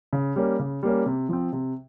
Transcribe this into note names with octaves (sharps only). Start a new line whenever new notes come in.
C#3
G3 A#3 C#4
C#3
G3 A#3 C#4
C3
F3 C4
C3